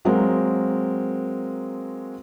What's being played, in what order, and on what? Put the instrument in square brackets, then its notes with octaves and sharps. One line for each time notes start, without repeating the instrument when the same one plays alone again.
[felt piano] F#3 G#3 A#3 C4 A#4